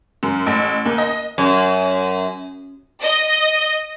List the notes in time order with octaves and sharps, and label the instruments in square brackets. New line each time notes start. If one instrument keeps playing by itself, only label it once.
[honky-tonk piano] F#2
A1
D#2
D#5
[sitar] F#2
[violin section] D#5